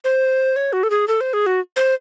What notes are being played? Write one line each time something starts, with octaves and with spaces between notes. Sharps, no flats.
C5
C#5
F#4
A4
G#4
A4
C5
G#4
F#4
C5